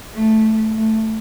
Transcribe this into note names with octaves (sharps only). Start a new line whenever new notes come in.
A3
A3